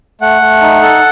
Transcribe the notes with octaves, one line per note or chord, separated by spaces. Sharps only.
A3 F#5
A3
D#4
A4